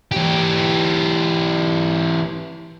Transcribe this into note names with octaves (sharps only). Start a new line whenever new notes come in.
E3 G4